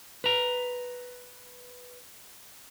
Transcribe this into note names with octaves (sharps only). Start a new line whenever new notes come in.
B4 A#5